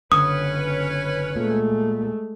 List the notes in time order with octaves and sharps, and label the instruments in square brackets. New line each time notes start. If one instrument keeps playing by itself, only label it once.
[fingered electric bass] F#1 D3 [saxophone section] C#4 B4 [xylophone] D#6
[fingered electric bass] A#2 [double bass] G#3 A3